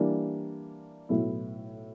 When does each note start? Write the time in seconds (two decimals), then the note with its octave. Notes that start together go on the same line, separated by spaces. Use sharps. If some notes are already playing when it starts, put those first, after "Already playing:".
Already playing: E3 G3 A#3 D4
1.09 B1 A2 F#3 B3 E4